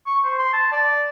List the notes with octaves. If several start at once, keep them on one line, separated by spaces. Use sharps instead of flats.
C#6
C5
C6
A5
D5